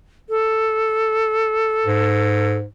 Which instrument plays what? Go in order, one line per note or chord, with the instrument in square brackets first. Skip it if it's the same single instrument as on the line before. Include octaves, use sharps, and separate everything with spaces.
[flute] A4
[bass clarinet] G#2